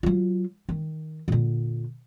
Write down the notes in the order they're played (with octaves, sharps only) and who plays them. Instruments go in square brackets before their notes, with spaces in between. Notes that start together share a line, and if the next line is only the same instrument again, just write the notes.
[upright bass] F#3 F4
D#3
A#2 D3